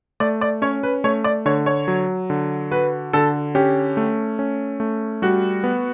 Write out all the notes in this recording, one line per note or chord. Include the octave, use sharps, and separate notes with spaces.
A3 D5
D5
C#4 C#5
B4
A3 C#5
D5
D3 C#5
C#5
F#3
D3
F#4 B4
D3 A4
C#4 G4
A3
C#4
A3
G3 F#4
B3